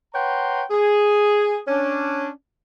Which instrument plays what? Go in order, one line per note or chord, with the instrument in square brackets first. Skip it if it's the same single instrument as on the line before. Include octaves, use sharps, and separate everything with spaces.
[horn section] B4 C#5 F#5 G5 A#5 C6
G#4
C#4 D4